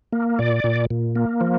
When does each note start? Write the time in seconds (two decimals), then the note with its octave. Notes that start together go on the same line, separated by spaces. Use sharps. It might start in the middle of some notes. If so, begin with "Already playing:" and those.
0.13 A#3
0.39 A#2 D5
0.64 A#2
0.90 A#2
1.16 A#3
1.41 F3